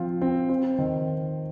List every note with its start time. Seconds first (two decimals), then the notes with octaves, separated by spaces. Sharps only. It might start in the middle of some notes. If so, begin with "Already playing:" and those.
Already playing: F3 C4 F4
0.22 C4
0.49 C4
0.78 D#3